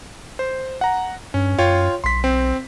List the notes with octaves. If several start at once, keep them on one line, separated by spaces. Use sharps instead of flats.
C5
F#5 A#5
G2 C#4
F#2 F4 C#5 G5
B1 C6 B6
C4